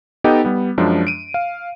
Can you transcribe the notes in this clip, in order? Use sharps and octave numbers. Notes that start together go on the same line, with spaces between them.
B3 D#4 G4 A4 D#5 G5
G3 B3
F#2 F3 G#3 D4
D7 D#7
F5